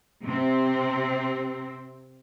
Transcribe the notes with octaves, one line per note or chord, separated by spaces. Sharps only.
C3 C4